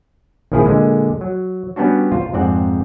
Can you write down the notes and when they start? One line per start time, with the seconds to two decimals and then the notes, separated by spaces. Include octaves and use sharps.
0.52 A#1 D#3 F3 E4 G#4
0.65 A#2 D3 G#3
1.21 F#3
1.76 G3 B3 C#4 D4 F#4
2.12 F4 C5
2.33 F2 G#2 C4 D5 F#5